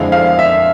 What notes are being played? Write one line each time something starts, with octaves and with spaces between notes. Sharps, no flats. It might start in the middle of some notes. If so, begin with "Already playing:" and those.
Already playing: F2 D3 G#3 C4 E4 F5
F5
E5